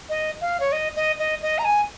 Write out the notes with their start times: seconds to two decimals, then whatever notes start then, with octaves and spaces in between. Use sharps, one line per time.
0.09 D#5
0.41 F5
0.60 C#5
0.72 D#5
0.96 D#5
1.19 D#5
1.42 D#5
1.59 A#5
1.65 G#5